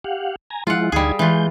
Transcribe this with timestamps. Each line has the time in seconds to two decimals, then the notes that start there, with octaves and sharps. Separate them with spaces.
0.04 G4 F5 F#5
0.50 G#5 A#5
0.67 F3 G#3 E4 F4 F#5
0.92 D2 G3 D#4 G#4 G#6
1.19 E3 G#3 F4 G6